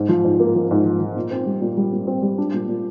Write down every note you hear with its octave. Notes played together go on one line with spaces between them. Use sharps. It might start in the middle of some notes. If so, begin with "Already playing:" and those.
Already playing: G#2
F3
G#2
A#3
F3
G#2
F3
F3
A#2
C4
G3
A#2
G3
A#2
C4
G3
D4
A#2
A#2